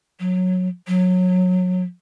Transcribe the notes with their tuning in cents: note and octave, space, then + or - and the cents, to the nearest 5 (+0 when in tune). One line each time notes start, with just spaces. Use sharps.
F#3 -15
F#3 -20